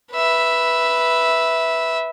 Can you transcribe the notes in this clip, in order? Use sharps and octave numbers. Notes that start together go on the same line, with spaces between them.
B4 E5